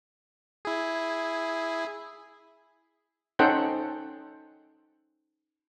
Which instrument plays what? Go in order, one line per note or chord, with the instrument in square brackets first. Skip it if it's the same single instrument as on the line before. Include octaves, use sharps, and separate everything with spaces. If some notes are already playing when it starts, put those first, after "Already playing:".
[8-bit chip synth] E4 G#4
[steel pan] C#4 D#4 A4 C5 F#5 G5